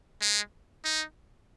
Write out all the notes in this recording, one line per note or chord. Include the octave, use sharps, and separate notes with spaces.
G#3
D#4